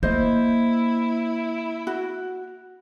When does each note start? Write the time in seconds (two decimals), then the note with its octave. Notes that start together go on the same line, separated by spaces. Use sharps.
0.03 A#3 E4 C5 D#5
1.87 F#4